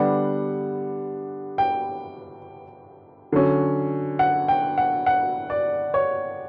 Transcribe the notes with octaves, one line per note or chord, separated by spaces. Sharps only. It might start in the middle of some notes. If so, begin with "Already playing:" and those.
Already playing: D3 G3 B3 D4 F#5
G5
D3 F#3 C#4
F#5
G5
F#5
F#5
D5
C#5